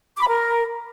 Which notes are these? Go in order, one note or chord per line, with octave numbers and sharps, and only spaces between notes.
D6
B5
A#4